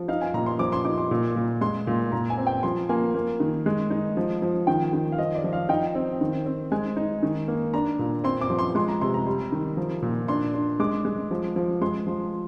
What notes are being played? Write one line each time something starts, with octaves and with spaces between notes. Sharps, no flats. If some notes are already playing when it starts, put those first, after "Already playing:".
Already playing: F3
D#4 F5
G#5
A#2 A#5
C6
F3 D6
C6
D#4 D6
D6
A#2
A#2
G#3 C6
A#2
A#2 A#5
G#5
C4
G5
F3 C6
A#3 G#5
A#3
D#3
G#3
D#4
F3
F3
D#3 G5
D#3
F5
F3 D#5
D5
F3
F5
D#4 G5
C4
D#3
C4
G#3 G#5
D#4
D#3
A#3
D4 A#5
A#2
C4 C6
D6
F3
C6
G#3 C6
A#5
C3 C6
A#5
G3
D#3
F3
A#2
D4 C6
D4
G#3 D6
G#3
F3
F3
G#3 C6
F3